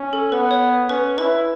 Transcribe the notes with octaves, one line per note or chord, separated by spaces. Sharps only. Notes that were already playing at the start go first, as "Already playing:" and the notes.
Already playing: C#4
A4
B3 B4
C#5
C#4 B4
E4 B4